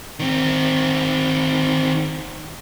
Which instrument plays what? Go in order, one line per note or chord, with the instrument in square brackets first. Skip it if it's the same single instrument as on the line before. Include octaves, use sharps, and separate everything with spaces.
[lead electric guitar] D#3 C4